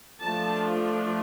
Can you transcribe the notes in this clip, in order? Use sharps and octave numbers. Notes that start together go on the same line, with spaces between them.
F3 A3 D4 F4 A5